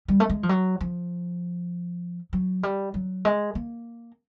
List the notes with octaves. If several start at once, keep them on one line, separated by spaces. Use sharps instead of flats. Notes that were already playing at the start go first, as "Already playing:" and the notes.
G3
A3
G#3
F3
F#3
F3
F#3
G3
F#3
G#3
A#3